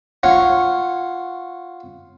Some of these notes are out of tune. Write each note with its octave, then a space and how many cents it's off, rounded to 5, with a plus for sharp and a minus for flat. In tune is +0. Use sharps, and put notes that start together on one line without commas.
F4 +0 C#5 -10 F#5 +0